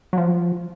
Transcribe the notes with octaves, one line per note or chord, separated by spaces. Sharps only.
F#3
F3